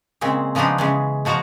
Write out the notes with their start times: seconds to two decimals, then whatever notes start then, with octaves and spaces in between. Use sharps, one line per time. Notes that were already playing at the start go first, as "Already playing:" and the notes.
0.21 A#2 C#3 G#3 C4
0.55 C#3 F3 G#3 B3 D4 D#4
0.78 C#3 E3 G#3
1.25 B2 F3 F#4 A5 A#5